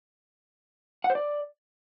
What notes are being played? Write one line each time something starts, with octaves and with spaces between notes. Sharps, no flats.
F#5
C5
D5